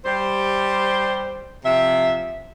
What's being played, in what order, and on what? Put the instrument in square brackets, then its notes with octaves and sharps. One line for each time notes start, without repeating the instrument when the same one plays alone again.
[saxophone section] G3 G4 C5
C3 F3 E5